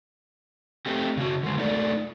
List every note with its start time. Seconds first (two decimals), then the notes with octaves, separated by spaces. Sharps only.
0.86 A3 C4 G4
1.17 C#3 F#4
1.43 D3 G#3
1.58 A3 D#4 F4 A4 D5